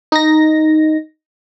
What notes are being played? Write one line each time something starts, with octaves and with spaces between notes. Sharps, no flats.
D#4 A#6